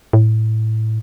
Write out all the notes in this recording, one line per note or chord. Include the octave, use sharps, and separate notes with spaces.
A2